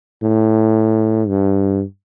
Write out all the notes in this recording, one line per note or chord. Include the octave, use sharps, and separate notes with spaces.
A2
G2